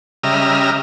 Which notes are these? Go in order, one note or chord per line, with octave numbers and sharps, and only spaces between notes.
C#3 G3 D#5 E5 A#5 F6